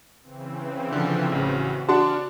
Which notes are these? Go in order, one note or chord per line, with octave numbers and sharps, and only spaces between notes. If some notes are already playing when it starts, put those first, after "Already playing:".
C#3 E3 C4
D3 F3
A1 C#3 F#4
D4 F#4 F#5 A5 F6